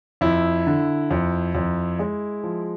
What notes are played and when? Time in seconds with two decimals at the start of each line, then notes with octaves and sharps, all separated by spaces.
0.21 F2 E4
0.67 D3
1.11 F2
1.55 F2
1.99 G#3
2.44 F3